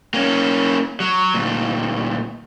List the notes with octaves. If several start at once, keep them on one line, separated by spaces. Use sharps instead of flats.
A#3 C#4
F#3
D2 A#2